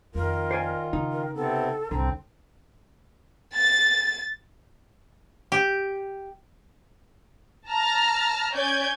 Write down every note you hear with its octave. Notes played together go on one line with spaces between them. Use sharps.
F2 D#3 F4 A#4
C5 D5 G#5
C#3 D#4
A#4
C3 B3 C4 A4
C2 G#2 D3 C4 A#5
A6
G4
A5 A#5 F6
C#4 D5 G6 G#6